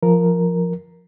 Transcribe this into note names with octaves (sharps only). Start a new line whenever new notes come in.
F3 A#4